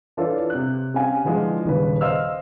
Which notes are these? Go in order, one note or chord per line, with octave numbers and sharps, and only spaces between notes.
E3 D4 F4 A4 B4 C#5
C3 F#6
C4 C#4 G4 F5 G#5
D3 E3 F3 G#3
D#1 D#2 C#3 B4
C5 D#5 F5 E6 F6